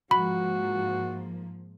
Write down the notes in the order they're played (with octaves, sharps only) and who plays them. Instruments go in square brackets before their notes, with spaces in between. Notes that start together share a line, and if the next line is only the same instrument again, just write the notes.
[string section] G#2 F3 A#3 [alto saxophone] F#4 [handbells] B5